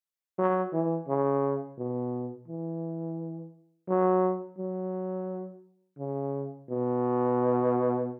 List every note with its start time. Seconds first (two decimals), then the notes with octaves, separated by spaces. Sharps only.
0.38 F#3
0.73 E3
1.08 C#3
1.78 B2
2.48 E3
3.88 F#3
4.58 F#3
5.98 C#3
6.69 B2